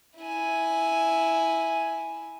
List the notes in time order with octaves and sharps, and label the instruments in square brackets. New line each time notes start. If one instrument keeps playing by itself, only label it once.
[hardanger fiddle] E4 G#5